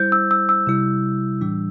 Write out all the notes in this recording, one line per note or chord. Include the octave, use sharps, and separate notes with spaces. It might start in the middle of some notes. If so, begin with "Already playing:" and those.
Already playing: G3 E4 C5 G6
E6
E6
E6
C3 G3 E4
A2 E3 G3 D4